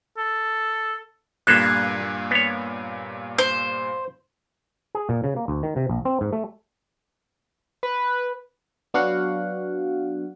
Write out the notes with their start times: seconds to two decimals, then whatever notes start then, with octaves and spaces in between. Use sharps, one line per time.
0.18 A4
1.47 G2 A#2 A#3 B3 A4 F#6 G#6 C7
2.31 B3 C#5
3.38 C5
4.95 G#4
5.09 A#2
5.24 C#3
5.36 A#3
5.48 D2
5.63 D#3
5.76 C3
5.90 A#1
6.05 C4
6.21 G#2
6.33 A3
7.83 B4
8.94 F#3 B3 D4 F#4 F5 F#5